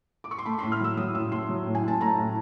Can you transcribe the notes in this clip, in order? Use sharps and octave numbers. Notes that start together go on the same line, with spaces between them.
D6
C#6
C6
A3 B5
A2 C6
F6
F#3 E6
F#3 D#6
A2 E6
A2 C6
F#3
A2
G#5
A2 A5
A3 A#5
A2